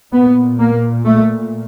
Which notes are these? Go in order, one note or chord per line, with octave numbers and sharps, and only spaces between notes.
A#2 B3
A#3
A3